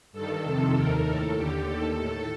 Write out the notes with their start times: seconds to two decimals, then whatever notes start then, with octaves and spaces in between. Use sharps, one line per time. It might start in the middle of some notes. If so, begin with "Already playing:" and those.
0.13 G2 D#3 A4
0.44 F2 C3 D#3
0.75 D#2 D#3 A#4
1.05 A2 A4
1.37 D#2 D3 G4
1.67 D#2 D#3 A4
1.98 A2